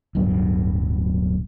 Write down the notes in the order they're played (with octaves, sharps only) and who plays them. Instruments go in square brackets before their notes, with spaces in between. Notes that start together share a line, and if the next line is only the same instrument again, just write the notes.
[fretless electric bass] D1 B1 G2 B2